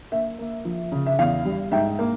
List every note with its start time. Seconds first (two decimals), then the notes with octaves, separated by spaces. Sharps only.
0.12 A#3 E5
0.39 A#3
0.65 F3
0.92 C#3
1.06 E5
1.19 E2 F5
1.45 G3
1.72 G#2 E5 G5
1.99 A#3